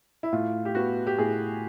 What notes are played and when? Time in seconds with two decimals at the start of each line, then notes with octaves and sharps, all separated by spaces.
0.23 E4
0.32 A2 F4
0.65 G4
0.75 B3 F#4
1.07 G4
1.18 A2 G#4